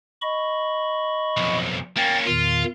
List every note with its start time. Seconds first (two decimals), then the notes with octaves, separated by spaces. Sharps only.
0.22 D#5 B5 C#6
1.37 B1 F2
1.97 A#3 C#4 G5 A6
2.27 E2 A#2 D#3 F4